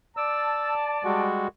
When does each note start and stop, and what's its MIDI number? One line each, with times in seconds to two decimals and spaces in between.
0.17 1.25 74
0.17 1.25 81
0.17 0.74 88
1.04 1.48 55
1.04 1.48 56
1.04 1.48 66